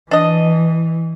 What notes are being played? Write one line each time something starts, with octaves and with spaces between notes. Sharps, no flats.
E3 D4 D#5